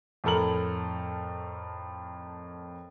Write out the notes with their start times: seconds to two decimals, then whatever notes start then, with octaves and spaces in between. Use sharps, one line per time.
0.24 F2 A2 A4 A#4 F#7